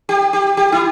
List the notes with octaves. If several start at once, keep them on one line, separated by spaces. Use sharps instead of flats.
G4
G4
G4
E4